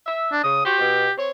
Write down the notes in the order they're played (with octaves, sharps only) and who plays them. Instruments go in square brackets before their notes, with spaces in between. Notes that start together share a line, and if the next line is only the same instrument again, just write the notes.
[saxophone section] E5
[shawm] D4
[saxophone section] C#3 [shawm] D#6
[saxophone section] F#4 C5 [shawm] G4
[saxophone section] B2
C4 C#5